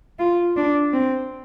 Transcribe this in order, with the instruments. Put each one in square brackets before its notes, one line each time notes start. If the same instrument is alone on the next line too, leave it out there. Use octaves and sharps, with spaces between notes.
[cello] F4
D4
C4